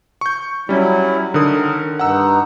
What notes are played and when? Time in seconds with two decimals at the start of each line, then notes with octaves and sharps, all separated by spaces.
0.21 C#6 G6
0.69 F#3 G3 C#4 E4
1.34 D3 D#3 A#4 D#6
1.99 G2 D#4 F#5 E6